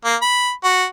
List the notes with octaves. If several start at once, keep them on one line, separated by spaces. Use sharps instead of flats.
A#3
B5
F#4